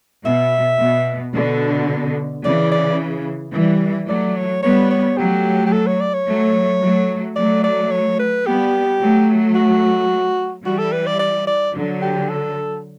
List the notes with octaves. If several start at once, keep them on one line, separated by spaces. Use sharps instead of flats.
B2 E5
B2
B2 D3
C#3 E3 D5
D5
E3 G3
F#3 A3 D5
C#5
G3 B3 C#5
C#5
F#3 A3 G4
G4
A4
C#5
D5
C#5
F#3 A3
F#3 A3
F#3 A3 D5
D5
C#5
B4
G3 B3 G4
F#3 A3
F#4
E3 G3 F#4
A4
B4
D5
D5
D5
D3 F#3
G4
A4